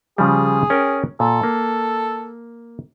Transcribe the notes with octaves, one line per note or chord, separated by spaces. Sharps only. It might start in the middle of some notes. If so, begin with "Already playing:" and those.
C#3 F3 G3 G#4
C#4 A#4 G5
A#2 A4
A#3